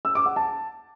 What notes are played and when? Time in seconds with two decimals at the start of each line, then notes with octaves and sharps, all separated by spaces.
0.05 E6
0.15 D6
0.26 F#5
0.36 A5